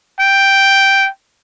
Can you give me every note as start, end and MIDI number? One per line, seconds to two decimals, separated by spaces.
0.20 1.08 79